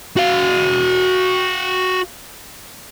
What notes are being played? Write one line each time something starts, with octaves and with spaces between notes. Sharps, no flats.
F#4 F5